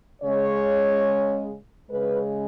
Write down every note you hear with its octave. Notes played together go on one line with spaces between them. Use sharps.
C#3 G#3 C#5
C#3 G#3 B4